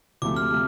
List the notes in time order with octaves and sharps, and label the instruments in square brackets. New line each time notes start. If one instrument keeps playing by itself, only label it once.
[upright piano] D2 C3 F3 A3 [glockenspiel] D6
[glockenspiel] F6
[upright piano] C3 F3 A3